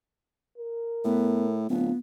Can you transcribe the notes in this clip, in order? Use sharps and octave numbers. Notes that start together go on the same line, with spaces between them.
A#4
A2 B3
D1 B3 F4